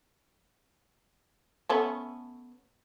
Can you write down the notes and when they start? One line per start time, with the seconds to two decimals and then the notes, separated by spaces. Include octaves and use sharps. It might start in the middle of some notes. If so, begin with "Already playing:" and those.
1.69 A3 B3 C#4